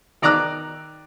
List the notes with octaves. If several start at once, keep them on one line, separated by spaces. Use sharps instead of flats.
D#3 D5 A#5 D6 E6 F#6